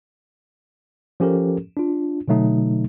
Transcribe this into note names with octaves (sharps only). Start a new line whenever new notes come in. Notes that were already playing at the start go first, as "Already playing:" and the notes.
F3 C#4 G4 A4 A#4
D4 F4
B2 D3 F#3 A3 D#4